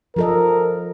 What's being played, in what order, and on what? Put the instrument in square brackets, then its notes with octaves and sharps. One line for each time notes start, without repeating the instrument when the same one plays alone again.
[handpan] F3 A4 D#5 [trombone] A#4